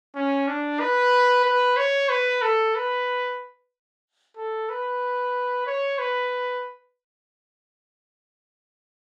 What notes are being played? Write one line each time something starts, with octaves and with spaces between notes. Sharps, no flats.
C#4
D4
B4
B4
C#5
B4
A4
B4
A4
B4
C#5
B4